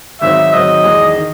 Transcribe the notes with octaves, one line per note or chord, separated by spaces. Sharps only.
G#1 G#2 F#3 C4 D#4 E5
G#2 D#3 F#3 C4 D#5
E2 D#3 G#3
D#3